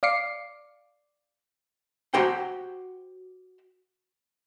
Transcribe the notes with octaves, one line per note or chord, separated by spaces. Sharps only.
D5 F5 D6 C7 C#7
F#4 G4 C5 F#5 G5